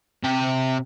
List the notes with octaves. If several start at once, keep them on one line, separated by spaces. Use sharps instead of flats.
C3 G5